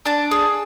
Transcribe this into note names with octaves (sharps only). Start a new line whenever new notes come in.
D4 A5
G#4